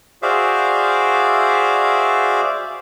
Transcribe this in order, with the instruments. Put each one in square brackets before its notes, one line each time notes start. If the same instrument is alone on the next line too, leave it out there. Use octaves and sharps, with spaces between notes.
[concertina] F#4 G#4 C5 D5 E5 F5